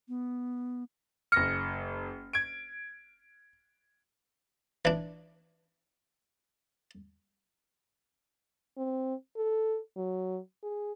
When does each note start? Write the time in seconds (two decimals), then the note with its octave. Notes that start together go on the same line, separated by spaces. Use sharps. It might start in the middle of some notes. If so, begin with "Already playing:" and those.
0.08 B3
1.32 F#1 F6 A#6 C#7
2.33 G#6 D7
4.85 E3 D4
8.78 C4
9.37 A4
9.97 F#3
10.64 G#4